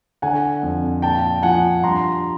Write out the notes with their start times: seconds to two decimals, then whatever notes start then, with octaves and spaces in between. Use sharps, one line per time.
0.22 D3 F#5 G#5
0.63 F2
1.02 A#2 G5 A5
1.43 F3 F#5 G#5
1.83 G2 A#5 C6